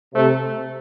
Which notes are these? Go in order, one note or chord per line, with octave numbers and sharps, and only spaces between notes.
C3 A3